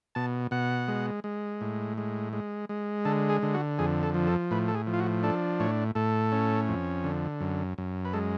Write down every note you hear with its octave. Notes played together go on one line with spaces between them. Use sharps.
B2 A5
B2 F#5
G#3
G#3
A2
G#3
G#3
G#3
D3 A4
G#4
D3
F#4
F2 G#4
A4
F3
A4
A2 B4
A4
G#4
F3
F4
F#4
D4 A4
A2 C#5
A2 A4
C#4
F2
D3
F#2
F#2
B4
G#3 A4